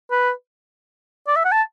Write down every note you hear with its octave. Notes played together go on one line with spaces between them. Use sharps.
B4
D5
E5
F#5
A5